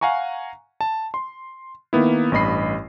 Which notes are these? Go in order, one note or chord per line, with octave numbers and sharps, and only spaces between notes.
F5 F#5 G#5 A#5 C#6
A5
C6
D#3 A#3 B3 E4
A1 G2 D#5 B5 C7